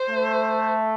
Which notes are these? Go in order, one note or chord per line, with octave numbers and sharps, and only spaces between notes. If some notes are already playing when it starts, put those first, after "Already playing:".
Already playing: C5
A3